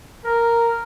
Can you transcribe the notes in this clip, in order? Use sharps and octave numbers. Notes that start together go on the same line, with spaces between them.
A#4